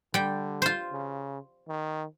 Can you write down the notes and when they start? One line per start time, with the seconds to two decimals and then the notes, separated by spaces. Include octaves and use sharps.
0.14 D3 G3 G5
0.62 F4 C5
0.92 C#3
1.68 D#3